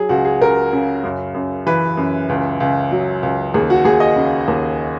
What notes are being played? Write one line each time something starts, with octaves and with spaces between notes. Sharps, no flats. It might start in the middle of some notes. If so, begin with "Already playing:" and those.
Already playing: F#3 G#4
C#2 F#4
G#4
C#2 A#4
C#3
F#2
F#2
E3 B4
F#2
C#2
C#2
F#3
C#2
D#2 G#4
F#4
D#2 G#4
D#5
C#3
D#2